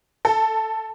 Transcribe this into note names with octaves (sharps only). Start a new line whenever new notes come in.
A4